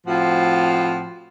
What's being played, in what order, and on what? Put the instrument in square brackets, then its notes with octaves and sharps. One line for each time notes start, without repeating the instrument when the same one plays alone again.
[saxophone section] A2 F3 C4 F4 F#4